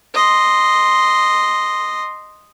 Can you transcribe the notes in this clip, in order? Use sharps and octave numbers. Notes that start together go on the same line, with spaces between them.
D#5 C6